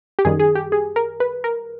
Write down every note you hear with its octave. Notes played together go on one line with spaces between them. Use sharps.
G4
F#2 D#3 G3 G#4
G#4
G4
G#4
A#4
B4
A#4